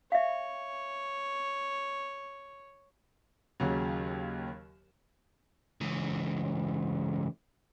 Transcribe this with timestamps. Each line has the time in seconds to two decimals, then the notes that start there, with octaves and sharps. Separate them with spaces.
0.12 C#5 E5 F5
3.60 D#2 C#3 F#3
5.81 C#2 E3